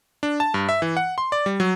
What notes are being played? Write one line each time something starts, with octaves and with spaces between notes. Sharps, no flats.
D4
A5
G2
E5
E3
F#5
C6
D5
G3
F#3